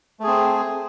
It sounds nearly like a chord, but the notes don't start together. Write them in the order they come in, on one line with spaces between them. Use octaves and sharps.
A3 G#4 C4